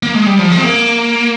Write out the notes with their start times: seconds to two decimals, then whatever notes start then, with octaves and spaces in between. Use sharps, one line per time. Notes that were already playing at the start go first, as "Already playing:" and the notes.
0.03 A#3
0.14 G#3
0.26 G3
0.39 F3
0.52 G#3
0.58 C4
0.64 A#3